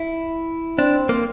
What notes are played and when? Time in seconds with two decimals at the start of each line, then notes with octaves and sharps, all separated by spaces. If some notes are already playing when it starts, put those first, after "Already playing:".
Already playing: E4
0.78 C4 D4
1.09 A#3